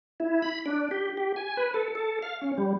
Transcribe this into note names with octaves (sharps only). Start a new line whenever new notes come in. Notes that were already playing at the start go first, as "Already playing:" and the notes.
E4
B5
D4
G4
G4
G#5
B4
A4
A4
F5
C#4
G3